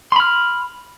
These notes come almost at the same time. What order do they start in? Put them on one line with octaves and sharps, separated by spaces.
C6 B5 F6